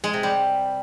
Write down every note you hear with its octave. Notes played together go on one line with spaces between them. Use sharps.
G#3
C3
G3